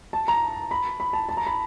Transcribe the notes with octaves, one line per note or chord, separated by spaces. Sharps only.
A5
A#5
B5
B5
A5
A5
A#5
B5